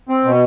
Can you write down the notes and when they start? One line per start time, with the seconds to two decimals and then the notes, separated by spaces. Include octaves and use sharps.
0.09 C4
0.25 B2